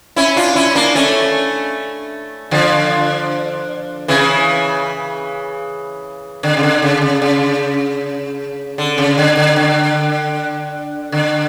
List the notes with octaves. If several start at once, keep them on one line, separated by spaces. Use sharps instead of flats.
C#4 E4
D4 F4
C#4 E4
A#3 D4
A3 C#4
D3 F3
C#3 E3
D3
C#3
D3
C#3
C#3
C#3
D3
C#3
D3
D3
D3
D3